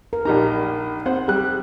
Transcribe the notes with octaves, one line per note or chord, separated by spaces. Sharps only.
A#4
A#1 D#4 G4 A#5
C4 C5 F#5
G3 G#4 F#6